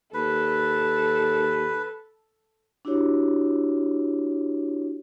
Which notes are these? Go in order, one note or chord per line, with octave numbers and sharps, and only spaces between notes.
D#2 A4 B4
D4 E4 F#4 G4 C#5